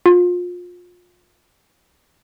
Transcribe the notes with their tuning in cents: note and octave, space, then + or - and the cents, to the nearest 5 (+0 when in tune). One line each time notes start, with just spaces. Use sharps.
F4 +30